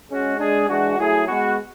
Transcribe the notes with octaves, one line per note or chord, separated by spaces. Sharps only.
G#3 C#4 F#4
G#3 D4 G#4
E3 G#3 D4 F#4
F#3 A3 E4 G#4
G#3 B3 F#4